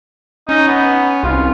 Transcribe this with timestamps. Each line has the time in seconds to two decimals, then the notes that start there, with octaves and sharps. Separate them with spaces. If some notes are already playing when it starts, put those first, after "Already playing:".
0.49 C#4 D#4
0.68 B3
1.23 C2 F4